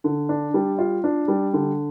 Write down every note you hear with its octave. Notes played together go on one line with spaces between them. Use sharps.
D3
D4
G3
F4
D4
G3
D3